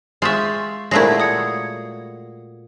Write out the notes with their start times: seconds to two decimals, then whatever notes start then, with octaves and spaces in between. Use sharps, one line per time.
0.22 G#3 F4 E5 G5 C#6 A6 C7
0.91 A#2 F#3 G#3 A3 E4 A#6 C7
1.20 D#6 G#6 C#7